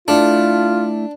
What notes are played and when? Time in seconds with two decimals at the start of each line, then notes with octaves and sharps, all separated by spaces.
0.08 A3 D4 E4 F4 A4